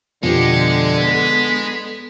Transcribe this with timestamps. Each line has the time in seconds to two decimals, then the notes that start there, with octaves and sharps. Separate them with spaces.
0.23 F2 B2 D3 F3 G#3 G4 C#7
0.98 B3 A4 B6